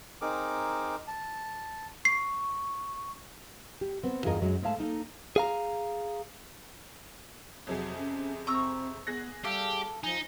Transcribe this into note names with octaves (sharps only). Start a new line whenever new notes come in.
C4 D#4 G#4 A#4 D6
A5
C#6 C7
G4
B3 C4
E2 G2 F4 G#4 A#4 D#5
F#2 F#3 G#3
G#2 G#3 A3 F5 A5
A#3 D#4 A4
G#4 F5 A#5
F2 C3 F#3 G#4
C#4
C4 A#5 C#6 E6
B3 G#4 F#6 A#6
G3 G4 A4 F5
F3 D#4 G#5